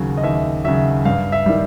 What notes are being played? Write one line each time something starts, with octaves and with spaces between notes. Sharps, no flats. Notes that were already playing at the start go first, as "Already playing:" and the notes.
Already playing: D#2 C#3 F#3
D#5
D#2 E5
C#3 F#3 E5
G2 F5
E5
D#3 G3